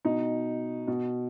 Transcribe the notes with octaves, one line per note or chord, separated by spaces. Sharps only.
B2 D#4
B2